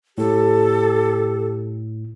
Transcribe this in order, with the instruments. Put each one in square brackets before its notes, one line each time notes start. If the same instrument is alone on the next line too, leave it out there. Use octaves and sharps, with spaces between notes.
[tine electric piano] A2 [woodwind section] G4 [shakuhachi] A4